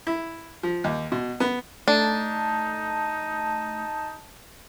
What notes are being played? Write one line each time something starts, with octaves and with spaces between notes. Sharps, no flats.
E4
F3
D#2
B2
B3
A3 D4 D#4 A5